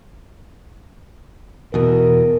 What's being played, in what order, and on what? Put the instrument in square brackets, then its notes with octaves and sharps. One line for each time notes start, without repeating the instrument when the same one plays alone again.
[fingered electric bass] E2 B2 [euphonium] A#4